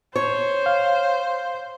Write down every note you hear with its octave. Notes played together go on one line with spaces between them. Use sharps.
C5 C#5
F5